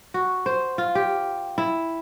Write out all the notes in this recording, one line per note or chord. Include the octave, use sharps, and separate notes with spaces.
F#4
C5
F4
G4
E4